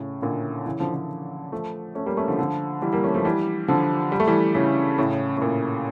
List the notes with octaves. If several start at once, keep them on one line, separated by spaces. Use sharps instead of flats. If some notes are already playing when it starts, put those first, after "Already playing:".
Already playing: A2 C#3
A#2 D3
C#3 E3
D3 F3
D3 F3
F3 A3
A3 C#4
G3 A#3
A3 C#4
D3 F3
D3 F3
E3 G3
G3 A#3
A3 C#4
F3 A3
E3 G3
D3 F3
G3
A3
E3 G3
C#3 E3
A2 C#3
A2
A#2